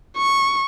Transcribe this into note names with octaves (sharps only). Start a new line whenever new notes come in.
C#6